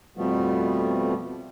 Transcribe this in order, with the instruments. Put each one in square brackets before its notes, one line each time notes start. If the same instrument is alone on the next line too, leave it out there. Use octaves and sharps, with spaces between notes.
[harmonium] F2 B2 F3 G3 A3 B3